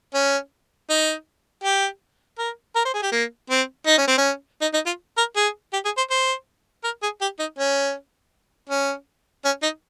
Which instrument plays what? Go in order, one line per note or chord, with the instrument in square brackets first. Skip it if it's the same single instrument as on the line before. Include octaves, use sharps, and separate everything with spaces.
[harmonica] C#4
D#4
G4
A#4
A#4
C5
G#4
G4
A#3
C4
D#4
C#4
C4
C#4
D#4
D#4
F4
A#4
G#4
G4
G#4
C5
C5
A#4
G#4
G4
D#4
C#4
C#4
C#4
D#4